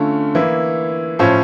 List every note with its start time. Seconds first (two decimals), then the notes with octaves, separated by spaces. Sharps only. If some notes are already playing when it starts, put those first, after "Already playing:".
Already playing: D3 A3 C#4 F4
0.35 E3 A#3 E4
1.19 A2 F3 C#4 F4